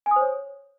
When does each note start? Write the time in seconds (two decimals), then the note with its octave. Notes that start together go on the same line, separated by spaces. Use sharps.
0.06 G#5
0.11 D#6
0.16 C5
0.21 C#5